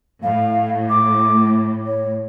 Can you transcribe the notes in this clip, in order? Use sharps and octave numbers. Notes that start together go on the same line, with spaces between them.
A2 F5
D6
C#5